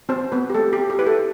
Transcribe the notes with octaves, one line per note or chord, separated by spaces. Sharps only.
C4 F#4 C5
B3 C4 B4
G4
A3 A4
G4
C4
G4
E4 B4
A4